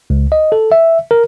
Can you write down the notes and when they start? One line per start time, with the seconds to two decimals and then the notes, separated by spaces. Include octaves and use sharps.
0.10 C#2
0.32 D#5
0.52 A4
0.72 E5
1.11 A#4